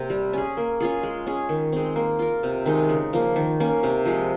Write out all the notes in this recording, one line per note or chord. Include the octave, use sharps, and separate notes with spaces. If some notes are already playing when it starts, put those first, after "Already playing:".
Already playing: C3 A#3 C4
G3
C#4 G#4
A#3
C#4 F4 G#4
G#3
C#4 G#4
D#3
G#3 C4
A#3
F4 A#4
C3
D#3 G#3 D#4
C#3
F3 A#3
D#3
A#3 C#4
C3
F3 G#3